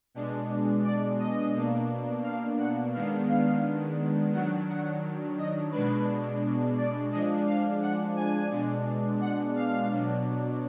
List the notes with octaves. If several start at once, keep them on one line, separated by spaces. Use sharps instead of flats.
B2 G#3 D4
D5
D#5
B2 A#3 D4
F5
F#5
D#3 G#3 B3 D4 F5
F5
D#3 F#3 D4 F#5
F#5
D#5
B2 G#3 D4 B4
D5
F3 G#3 D4 D#5
F5
F#5
G#5
B2 G#3 D4
F#5
F5
B2 F#3 D4